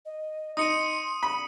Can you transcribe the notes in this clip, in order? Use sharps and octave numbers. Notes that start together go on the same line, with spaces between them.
D#5
D#4 C6 D#6 C#7 D#7
B5